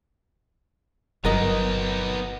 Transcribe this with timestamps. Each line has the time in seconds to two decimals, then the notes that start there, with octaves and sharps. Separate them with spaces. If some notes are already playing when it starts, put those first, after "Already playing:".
1.25 G1 F#3 B3 D#4 A#4 D#5